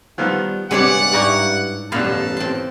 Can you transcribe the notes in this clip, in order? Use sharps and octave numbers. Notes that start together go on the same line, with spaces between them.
D#3 F3 G3 B3
G2 C3 G3 G#3 B3 C#5 D5 F#5
G#2 E4 D5 G5 A#5 C#6
A1 F#2 B2 G3 B3 F5 A5
C4 C6